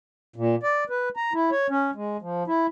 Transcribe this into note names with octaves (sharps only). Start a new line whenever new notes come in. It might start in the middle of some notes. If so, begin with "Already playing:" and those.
A#2
D5
B4
A#5
E4
C#5
C#4
G#3
F3
E4